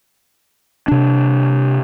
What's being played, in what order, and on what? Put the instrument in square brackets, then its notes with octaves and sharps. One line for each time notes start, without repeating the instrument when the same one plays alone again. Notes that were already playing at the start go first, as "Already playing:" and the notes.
[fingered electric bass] C3 D4